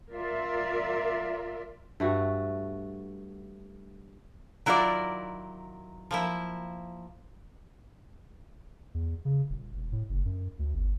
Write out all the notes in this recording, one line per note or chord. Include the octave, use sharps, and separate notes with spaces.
F4 A#4 D5 E5
G2 A3 F#4
D#3 F#3 E4 F4 A#4 D5
F3 A#3 E4
E2
C#3
D#1
E1
A2
F#1
F#2
D2
G1